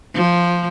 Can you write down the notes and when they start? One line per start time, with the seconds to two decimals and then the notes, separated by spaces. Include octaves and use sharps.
0.15 F3